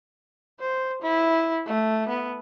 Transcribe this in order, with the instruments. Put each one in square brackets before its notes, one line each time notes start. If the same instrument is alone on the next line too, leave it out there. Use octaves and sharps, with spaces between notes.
[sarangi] C5
E4
A3
B3